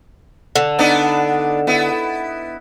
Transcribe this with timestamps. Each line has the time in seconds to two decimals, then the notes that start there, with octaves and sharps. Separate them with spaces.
0.56 D3
0.79 B3 D4 D#4
1.67 B3 E4